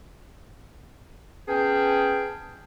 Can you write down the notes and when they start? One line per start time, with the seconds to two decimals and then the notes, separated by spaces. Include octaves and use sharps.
1.48 B3 C#4 G#4 G5 A5